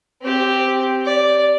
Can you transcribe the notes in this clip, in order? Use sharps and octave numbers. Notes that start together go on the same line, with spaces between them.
C4 G4
D5